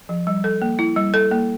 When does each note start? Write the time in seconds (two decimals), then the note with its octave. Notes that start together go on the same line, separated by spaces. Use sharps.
0.09 F3
0.27 G3
0.44 A4
0.62 A#3
0.79 E4
0.96 G3
1.14 A4
1.31 A#3